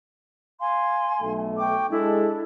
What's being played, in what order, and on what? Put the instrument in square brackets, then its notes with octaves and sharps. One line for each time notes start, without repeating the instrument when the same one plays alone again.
[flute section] F5 G#5 C6
[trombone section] B1 A3
[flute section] G5 C#6 D6
[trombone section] G#3 A4 [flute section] D4 E4